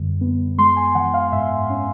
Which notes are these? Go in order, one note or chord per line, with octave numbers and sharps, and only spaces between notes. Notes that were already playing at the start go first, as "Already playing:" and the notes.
Already playing: F#2 D3 G3
B3
G#3 C6
G#5
E3 F#5
F5
G#2 E5
C#4